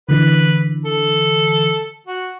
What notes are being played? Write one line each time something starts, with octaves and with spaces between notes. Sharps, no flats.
D3 E3 B4
A4
F#4